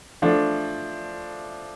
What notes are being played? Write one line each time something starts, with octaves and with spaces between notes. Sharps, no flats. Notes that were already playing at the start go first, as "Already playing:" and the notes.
F3 A3 D4